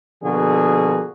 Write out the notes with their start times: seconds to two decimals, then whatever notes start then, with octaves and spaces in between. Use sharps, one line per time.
0.23 B2 D3 F3 A#3 F#4 G#4